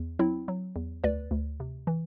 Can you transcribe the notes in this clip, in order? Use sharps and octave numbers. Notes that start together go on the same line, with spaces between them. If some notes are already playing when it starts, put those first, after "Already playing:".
Already playing: E2
F#3 C4 E4
F#3
E2
D2 B4 D5
D2
C3
E3